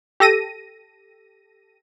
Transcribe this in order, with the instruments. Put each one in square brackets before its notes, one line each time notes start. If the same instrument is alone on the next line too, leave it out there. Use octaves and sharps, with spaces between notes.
[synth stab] G4 A4 A#6 D#7